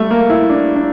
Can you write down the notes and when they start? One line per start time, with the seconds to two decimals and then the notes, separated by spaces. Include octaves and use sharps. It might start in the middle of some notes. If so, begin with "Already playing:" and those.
Already playing: G3 A3
0.10 A#3
0.29 E4
0.50 D4
0.76 D4